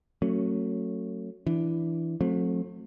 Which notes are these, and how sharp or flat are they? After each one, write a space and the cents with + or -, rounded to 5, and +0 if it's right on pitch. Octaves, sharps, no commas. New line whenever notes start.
F#3 +0 A3 +30 C#4 -15
E3 +5 D4 -5
F#3 -40 A3 +0 C4 +20